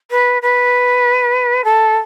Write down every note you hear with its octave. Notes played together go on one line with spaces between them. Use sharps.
B4
B4
A4